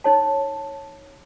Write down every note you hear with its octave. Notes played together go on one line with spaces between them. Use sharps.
D#4 C#5 A5